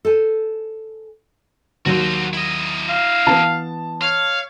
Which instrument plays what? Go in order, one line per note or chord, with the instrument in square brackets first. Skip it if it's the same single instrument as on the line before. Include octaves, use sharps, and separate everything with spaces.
[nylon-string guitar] A4 C5 G#5
[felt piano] D#2 F#3 D#7 [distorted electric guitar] F#4 C5
[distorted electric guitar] E4 D#5
[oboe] F5
[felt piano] E3 B3 [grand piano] A5
[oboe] C#5 [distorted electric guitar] F5